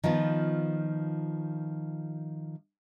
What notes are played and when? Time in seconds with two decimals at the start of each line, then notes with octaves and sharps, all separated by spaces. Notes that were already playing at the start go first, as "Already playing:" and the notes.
0.03 D#3 F3 B3 F4